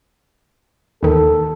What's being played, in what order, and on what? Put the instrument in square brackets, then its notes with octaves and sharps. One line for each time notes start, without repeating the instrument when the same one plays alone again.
[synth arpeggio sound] D#2 D#3 [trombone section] A4